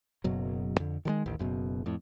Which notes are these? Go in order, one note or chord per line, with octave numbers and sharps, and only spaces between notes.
F#1 F#2 B2 F#3
F2 D3
D#3 F3 G#3
A1 D#2
F#1 F#2 B2
F2 A2